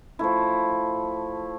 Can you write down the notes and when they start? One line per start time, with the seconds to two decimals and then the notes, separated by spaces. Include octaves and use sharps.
0.19 F3 A3 E4